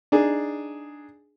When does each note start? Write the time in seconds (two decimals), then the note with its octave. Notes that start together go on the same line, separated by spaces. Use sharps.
0.12 D4 D#4 G#4